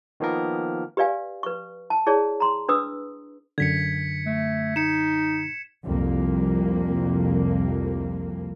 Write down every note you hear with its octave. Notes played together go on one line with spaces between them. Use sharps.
D#3 F3 A#3 B3 A#4
G4 B4 D5 F5 G#5
B4 C#6
A5
E4 G#4 C#5 D5 A5
A#5 C6
D4 B4 D#6 E6
F#2 D3 G#6 B6 C#7
A3
D#4 C#7 E7
C2 F2 A#3